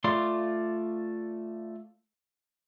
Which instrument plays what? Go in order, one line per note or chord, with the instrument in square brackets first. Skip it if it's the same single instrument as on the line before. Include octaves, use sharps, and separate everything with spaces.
[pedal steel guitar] A3 F4 D5 C6